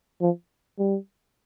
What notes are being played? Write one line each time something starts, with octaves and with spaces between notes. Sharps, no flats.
F3
G3